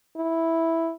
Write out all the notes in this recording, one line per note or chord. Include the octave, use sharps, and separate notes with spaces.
E4